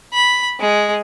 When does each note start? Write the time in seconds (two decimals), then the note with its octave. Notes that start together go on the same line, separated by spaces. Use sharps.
0.13 B5
0.60 G#3